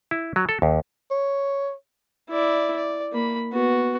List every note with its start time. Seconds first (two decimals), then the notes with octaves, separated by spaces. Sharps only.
0.11 E4
0.36 F#3
0.49 A4
0.62 D#2
1.11 C#5
2.30 E4 D5
2.76 D5
3.12 A#3 B5
3.53 B3 F#4